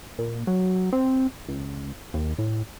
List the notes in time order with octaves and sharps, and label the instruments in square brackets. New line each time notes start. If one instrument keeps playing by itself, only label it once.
[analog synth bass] A#2
F#3
C4
C#2
D#2
A2